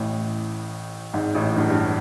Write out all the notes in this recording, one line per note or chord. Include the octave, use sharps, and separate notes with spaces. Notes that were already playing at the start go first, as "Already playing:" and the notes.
Already playing: A1 A2
G#1 G#2
A1 A2
G1 G2
G2